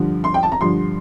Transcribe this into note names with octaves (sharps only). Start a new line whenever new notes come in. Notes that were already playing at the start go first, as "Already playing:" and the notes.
Already playing: G2 D3 F3
C6
G5
A5
A#5
G2 D3 F3 C6